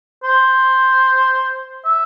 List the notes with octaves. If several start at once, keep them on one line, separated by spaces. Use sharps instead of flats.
C5
E5